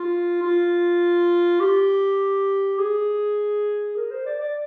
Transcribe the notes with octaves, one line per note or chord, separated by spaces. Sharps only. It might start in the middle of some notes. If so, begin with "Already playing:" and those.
Already playing: F4
F4
G4
G#4
A#4
C5
D5
D5